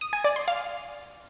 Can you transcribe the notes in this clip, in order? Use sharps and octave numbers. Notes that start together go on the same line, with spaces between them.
D#6
G#5
D5
C6
F5